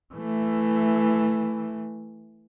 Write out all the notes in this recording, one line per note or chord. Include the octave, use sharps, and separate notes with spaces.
E3 A3